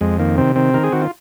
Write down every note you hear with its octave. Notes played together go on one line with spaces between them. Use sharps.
F2 G#3
D#3 A#3
C3 C4
D#3 C4
D#3 A#4
G#4
D#3 F#4
F4